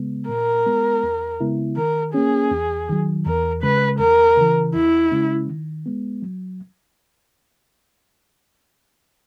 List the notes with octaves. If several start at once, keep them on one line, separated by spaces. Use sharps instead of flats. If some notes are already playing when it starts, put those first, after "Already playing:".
Already playing: C#3 G#3 B3
A#2 A#4
G#3 B3
E2
C#3 G#3 B3 E4
D#3 A#4
A#3 C#4 G#4
E2
D#3 F#3
E2 A#4
C#3 G#3 B4
E2 A#4
C#3 E3
E2 E4
C#3 G#3 C#4
D#3
G#3 B3
F#3